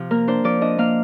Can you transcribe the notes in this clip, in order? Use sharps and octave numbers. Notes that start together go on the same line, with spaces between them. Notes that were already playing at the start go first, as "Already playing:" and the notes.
Already playing: C3 F3
A#3 A#4
D4 C5
F3 D5
D4 D#5
A#3 F5